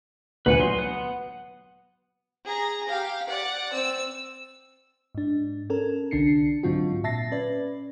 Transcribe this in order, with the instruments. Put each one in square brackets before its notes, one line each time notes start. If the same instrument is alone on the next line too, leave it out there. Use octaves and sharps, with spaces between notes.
[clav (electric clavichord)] D2 A#2 B3 [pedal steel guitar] B4 F#5 G#5
[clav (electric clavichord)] F#3 [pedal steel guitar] D#4 C6
[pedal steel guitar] B3 F#5 F#6
[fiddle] G#4 A#5
G4 F5
D5 F#5
C4 E6
[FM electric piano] G#2 D4
C#4 A4 A#4
C2 D3 D4 C7 C#7
G#2 D3 F#3 C4 F4 F#4
A#2 E5 A5 A6 A#6 C7
C#4 B4 D5